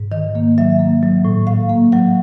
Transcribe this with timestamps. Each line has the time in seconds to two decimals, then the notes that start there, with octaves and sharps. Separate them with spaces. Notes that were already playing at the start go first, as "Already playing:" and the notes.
Already playing: G#2
0.12 D#3 D#5
0.35 A#3
0.58 F#3 E5
0.79 A#3
1.03 F#3
1.25 A2
1.47 A2 F5
1.69 A#3
1.92 F#3 F#5